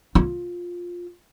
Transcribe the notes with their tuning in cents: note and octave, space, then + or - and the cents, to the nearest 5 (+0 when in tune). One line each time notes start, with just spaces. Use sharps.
F4 +10